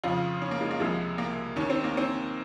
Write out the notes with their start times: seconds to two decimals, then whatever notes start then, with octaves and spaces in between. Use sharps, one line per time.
0.04 F2 C#3 F3 F4
0.42 C#4
0.51 A#3
0.61 G#3
0.71 A#3
0.80 C2 C3 F3 G#3
1.18 A#3
1.56 D#2 D#3 C#4
1.70 C4
1.84 A#3
1.97 C4